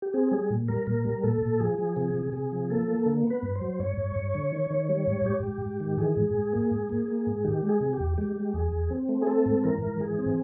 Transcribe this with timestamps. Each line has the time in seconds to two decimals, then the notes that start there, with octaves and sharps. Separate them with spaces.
0.02 G4
0.13 C4 G#4
0.32 G3 G#4
0.50 A#2
0.68 G3 A#4
0.87 A#2 A#4
1.05 G3
1.23 A#2 A4
1.42 A#2
1.60 F3 G#4
1.79 F3
1.96 C3 G#4
2.14 C3
2.32 C3 G#4
2.52 F3
2.70 A#3 A4
2.88 A#3
3.06 D3
3.24 B3
3.30 B4
3.43 G2
3.55 C5
3.61 F#3
3.79 G2 C#5
3.98 G2
4.16 G2
4.34 D3
4.52 D#3
4.71 D#3
4.89 G3
5.07 G#2
5.25 G#2 G4
5.44 G#2
5.62 G#2
5.80 D#3
5.98 E3 G#4
6.17 G#2
6.35 G#2
6.53 A#3
6.71 G#2
6.89 A#3
7.08 A#3
7.27 G#2
7.44 D#3 G4
7.63 G#3
7.69 G#4
7.81 C3
7.93 G4
8.00 E2
8.18 G#3 G4
8.36 G#3
8.54 E2 G#4
8.72 E2
8.90 C4
9.09 A3
9.22 G#4
9.27 C4 A4
9.46 G#2
9.64 E3 A#4
9.82 G#2
10.00 E3 G#4
10.19 C4